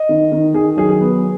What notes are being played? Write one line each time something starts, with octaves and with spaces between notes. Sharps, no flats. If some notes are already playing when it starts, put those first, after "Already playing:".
Already playing: D#5
D#3
D#3
D#3 G#4
F#3 G#4
G#4
B3